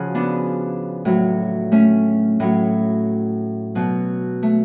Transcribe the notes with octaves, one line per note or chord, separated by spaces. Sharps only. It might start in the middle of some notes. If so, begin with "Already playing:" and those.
Already playing: C#3 F3 F#4 G#4
B3 D4
A2 F#3
A3 C#4
A2 F#3
B2 F#3
A3